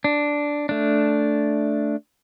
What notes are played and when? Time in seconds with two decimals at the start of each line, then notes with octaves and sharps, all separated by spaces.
0.04 D4
0.69 A3 D4